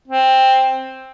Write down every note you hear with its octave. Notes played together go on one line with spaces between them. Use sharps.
C4